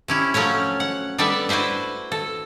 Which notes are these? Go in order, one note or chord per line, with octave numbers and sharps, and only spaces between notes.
C3 C#4 E4
F3 F#3 A3 C#4 C#5
F#5
G3 B3 A4 D5 E5
E4 F#4 B4 C5 E5
A4